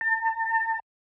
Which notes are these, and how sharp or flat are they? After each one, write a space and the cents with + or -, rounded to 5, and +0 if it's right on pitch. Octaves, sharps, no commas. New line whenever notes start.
A5 +40